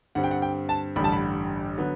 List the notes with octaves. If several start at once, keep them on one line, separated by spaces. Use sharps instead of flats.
G2 D3 G3 C4 F#5
G5
F#5
G5
A5
A1 G2 D3 G3 B5
A5
B5
D3 F#3 B3